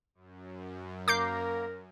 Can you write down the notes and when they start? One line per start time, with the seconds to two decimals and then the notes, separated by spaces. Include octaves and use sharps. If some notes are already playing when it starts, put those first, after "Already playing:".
0.15 F#2
1.08 A#3 A#4 A#5 D6 G6 C7